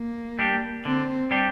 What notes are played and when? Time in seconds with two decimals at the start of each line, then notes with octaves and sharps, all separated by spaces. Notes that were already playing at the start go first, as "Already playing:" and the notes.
Already playing: A#3
0.39 G3 D4 G4
0.85 D3 C4
1.31 G3 D4 G4